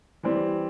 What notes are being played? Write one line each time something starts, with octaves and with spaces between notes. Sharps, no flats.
E3 G3 C4